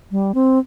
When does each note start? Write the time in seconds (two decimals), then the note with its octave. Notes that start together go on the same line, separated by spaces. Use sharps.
0.11 G3
0.35 C4